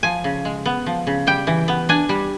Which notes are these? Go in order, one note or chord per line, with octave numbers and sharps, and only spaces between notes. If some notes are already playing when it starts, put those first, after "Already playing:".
F3 G#5
C#3
G#3
B3
F3
C#3
G3 G5
E3
B3
D4 G#5
G3